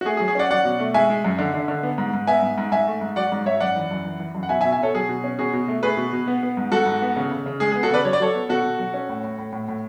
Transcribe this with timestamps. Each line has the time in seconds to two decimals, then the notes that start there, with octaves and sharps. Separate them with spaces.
0.01 F#4
0.05 A3 G#4
0.17 G#4
0.20 F#3
0.28 G#4
0.35 C#4 D5 F#5
0.51 F#3 D5 F#5
0.65 B2
0.80 A3
0.94 G#3 E5 G#5
1.10 G#3
1.25 F#2
1.39 D3
1.54 D3
1.68 D3
1.83 B3
1.98 G#2
2.14 G#2
2.27 B3 E5 G#5
2.43 G#2
2.58 G#2
2.72 G#2 E5 G#5
2.87 A3
3.01 G#2
3.16 F#3 D5 F#5
3.32 G#2
3.46 G#2 C#5 E5
3.60 F#2 D5 F#5
3.76 E3
3.91 F#2
4.05 E3
4.20 E3
4.35 F#2
4.43 F#5
4.49 B2 E5 G#5
4.61 E5 G#5
4.65 B2
4.72 E5 G#5
4.79 B2 A4 C#5
4.95 F#3 G#4
5.09 B2
5.24 C#4
5.39 B2 G#4
5.53 B2
5.68 A3
5.83 A3 G#4 B4
5.97 B2
6.13 B2
6.28 B3
6.43 B3
6.57 G#2
6.72 G#2 F#4 A4
6.86 G#2
7.02 B3
7.16 C#3
7.31 C#3
7.46 C#3
7.60 G#3 G#4
7.72 G#4
7.76 B3
7.83 F#4 A4
7.90 C#3 B4 D5
8.04 F#3 C#5
8.13 D5
8.20 F#3 A4 C#5
8.35 B3
8.49 B2 F#4 A4
8.64 B2
8.79 F#3
8.94 C#4
9.09 A2
9.24 A2
9.38 A2
9.53 A2
9.68 A2